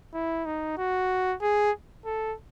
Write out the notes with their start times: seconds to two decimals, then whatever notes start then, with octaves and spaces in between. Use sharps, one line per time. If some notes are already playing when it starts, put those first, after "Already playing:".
0.14 E4
0.45 D#4
0.78 F#4
1.42 G#4
2.05 A4